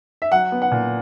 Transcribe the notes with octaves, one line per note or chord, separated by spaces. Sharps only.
E5
F#3 F#5
B3
F#5
A#2